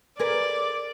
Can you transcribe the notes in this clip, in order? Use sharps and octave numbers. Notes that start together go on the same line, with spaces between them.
G#4 A#4 B4 D5